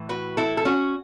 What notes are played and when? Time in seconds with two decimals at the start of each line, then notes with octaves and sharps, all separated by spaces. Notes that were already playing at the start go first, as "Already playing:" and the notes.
Already playing: A2 E3
0.09 F#4 B4
0.37 E4 A4
0.57 A4
0.65 C#4 F#4